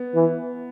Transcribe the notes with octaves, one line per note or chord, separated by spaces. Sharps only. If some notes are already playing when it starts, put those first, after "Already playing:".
Already playing: B3
E3